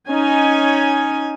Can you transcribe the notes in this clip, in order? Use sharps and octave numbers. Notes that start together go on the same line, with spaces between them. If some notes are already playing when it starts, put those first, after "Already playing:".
C#4 D#4 G#5